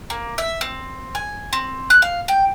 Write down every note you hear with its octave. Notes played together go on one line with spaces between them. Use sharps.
A#3
E5
C4
G#5
C4
F#6
F5
G5